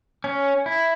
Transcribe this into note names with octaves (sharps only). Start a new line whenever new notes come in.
C#4
E4